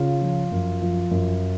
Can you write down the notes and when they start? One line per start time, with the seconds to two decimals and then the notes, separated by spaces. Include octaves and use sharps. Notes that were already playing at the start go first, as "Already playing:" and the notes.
Already playing: C#3 F4
0.21 F3
0.52 F#2
0.82 F3
1.11 F#2